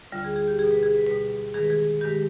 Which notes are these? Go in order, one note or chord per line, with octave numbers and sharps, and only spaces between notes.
D2 D3 G3 F4
G#4
G#4
G4
B2 G3 G#4
B4
G#4
B4
B2 G3 B4
G2 D#3 G#3 G#4
B4
G#4
G2 D#3 G#3 G4